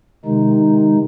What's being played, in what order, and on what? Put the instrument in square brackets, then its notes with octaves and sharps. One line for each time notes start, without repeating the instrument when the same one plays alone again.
[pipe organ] C3 D#3 G#3 D#4